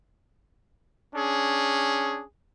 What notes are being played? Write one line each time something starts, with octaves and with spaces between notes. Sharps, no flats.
C#4 D4 G#4